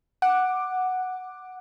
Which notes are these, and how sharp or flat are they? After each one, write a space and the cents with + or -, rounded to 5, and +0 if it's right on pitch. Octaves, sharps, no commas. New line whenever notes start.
F#5 +0 D6 +10